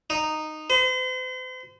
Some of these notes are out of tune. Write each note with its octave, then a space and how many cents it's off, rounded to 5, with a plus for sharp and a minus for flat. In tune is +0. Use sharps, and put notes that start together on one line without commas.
D#4 -10
C5 -40